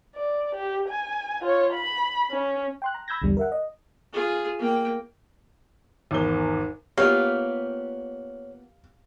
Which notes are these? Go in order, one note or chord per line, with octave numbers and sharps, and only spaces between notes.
D5
G4
G#5
F4 C#5
B5
C#4
G5 C6 F#6
A#5
B5 E6 G6 G#6 A#6
B1 E2 D3 G3
A#4 E5 F#5
D#5
F4 G#4
A#3 G5
G#1 E2 G7
A#3 B3 F4 G4 C#5 F5